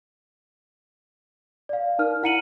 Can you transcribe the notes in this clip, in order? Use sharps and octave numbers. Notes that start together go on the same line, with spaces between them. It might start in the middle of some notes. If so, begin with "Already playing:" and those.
D5 F5
D#4 A#4 F6
E4 F#5 A#5 C#7 D#7 F#7